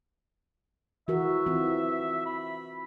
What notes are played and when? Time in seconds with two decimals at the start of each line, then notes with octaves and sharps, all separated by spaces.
1.08 E3 F#4 A#4 E5
1.46 E3 C4 F4
2.26 B5